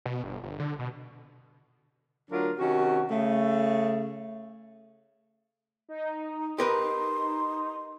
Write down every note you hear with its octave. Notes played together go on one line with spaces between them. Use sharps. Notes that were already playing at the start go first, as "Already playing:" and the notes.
B2
G1
G1
D3
B2
D2 F#3 D4 F4 A#4
C3 D#3 C#4 F#4
C#3 A3
D#4
G4 A#4 B4 C6